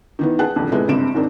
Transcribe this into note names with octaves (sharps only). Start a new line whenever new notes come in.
D#3 E3 B3
G#4 B4 F#5 G5 A5 F#6
D#1 F2 D3
A2 C3 G#3 A3 B3
F#1 G2 C3 C4 D7 E7
D#2 G#2 A#3 C4 D4